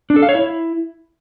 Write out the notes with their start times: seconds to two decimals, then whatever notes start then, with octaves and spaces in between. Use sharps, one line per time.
0.10 D4
0.16 A4
0.22 F5
0.29 C#5
0.35 E4